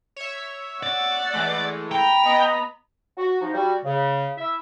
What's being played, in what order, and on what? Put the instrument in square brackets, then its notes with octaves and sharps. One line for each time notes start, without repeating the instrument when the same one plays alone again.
[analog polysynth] C#5 E5
[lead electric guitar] D5 [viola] F#5
[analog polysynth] E3 G#3 A3
[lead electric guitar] G5 [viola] A#5 B5
[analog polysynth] B3 [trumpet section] D#5
[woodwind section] F#4
F3 D#4
G3 F#4
C#3
E4 E5